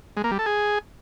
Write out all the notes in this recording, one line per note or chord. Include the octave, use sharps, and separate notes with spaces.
G#3
A#3
G3
A4
G#4